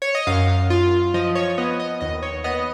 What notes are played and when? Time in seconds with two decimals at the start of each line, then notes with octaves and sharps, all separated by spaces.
0.02 C#5
0.15 D#5
0.27 F#2 F5
0.70 F4
1.14 F3 D#5
1.35 C#5
1.58 B3 D#5
1.80 D#5
2.01 D#2 D#5
2.23 C#5
2.44 B3 D#5